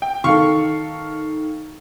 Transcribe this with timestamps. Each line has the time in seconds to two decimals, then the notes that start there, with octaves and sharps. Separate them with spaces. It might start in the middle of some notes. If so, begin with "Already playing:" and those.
0.02 G5
0.24 D#3 A4 F5 C#6